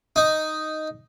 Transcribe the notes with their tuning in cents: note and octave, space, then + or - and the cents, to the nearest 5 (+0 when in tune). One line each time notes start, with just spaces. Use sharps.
D#4 +0